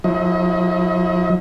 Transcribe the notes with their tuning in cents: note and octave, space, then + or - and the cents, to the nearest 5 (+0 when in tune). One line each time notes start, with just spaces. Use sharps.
F3 +45 E4 +5 D#5 +30